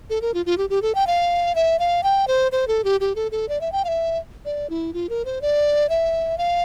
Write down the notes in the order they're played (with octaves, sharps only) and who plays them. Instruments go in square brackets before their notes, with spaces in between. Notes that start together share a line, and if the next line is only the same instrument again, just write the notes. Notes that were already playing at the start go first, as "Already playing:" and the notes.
[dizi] A4
A#4
F4
F4
G4
G4
A4
G5
F5
E5
F5
G5
C5
C5
A4
G4
G4
A4
A4
D5
E5
G5
F5
E5
D5
E4
F4
A#4
C5
D5
E5
F5